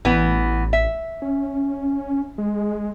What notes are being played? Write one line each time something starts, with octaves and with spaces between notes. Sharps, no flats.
A1 E3 B3
E5
C#4
G#3